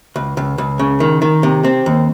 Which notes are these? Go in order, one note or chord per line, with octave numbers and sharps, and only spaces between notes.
C#2
C#2
C#2
C#3
D#3
D#3
C3
C4
D#2